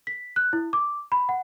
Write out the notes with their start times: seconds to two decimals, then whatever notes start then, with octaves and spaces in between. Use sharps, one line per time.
0.07 B6
0.36 F#6
0.53 E4
0.73 D6
1.12 B5
1.29 F#5